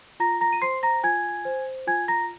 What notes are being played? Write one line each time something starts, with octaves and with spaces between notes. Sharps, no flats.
F4 A#5 A#6
A#5 A#6
D#7
C5 C6 C7
A#5 A#6
F4 G#5 G#6
C5
F4 G#5 G#6
A#5 A#6